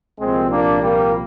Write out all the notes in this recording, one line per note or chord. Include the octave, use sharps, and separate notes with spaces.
C2 A#2 F3 G#3 C4
A#3 D4
G3 A#3